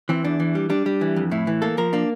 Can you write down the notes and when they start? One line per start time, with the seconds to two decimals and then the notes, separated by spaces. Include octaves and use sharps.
0.09 E3 C4
0.24 E2 D4
0.40 E3
0.55 G3
0.70 G3 D4
0.86 G3
1.01 E3
1.16 F2
1.31 A2 E4
1.47 E3
1.62 A#3 A4
1.78 F3 A#4
1.93 A#3 D4